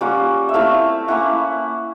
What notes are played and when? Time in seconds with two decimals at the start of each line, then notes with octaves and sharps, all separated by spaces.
0.01 G3 A#3 C#4 F4 F#5
0.49 E5
0.54 A3 C4 E4 F5
1.08 A#3 C#4 E4 F#5